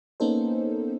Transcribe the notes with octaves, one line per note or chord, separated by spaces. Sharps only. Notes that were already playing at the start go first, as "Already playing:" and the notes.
A#3 B3 C#4 D#4 A4 C5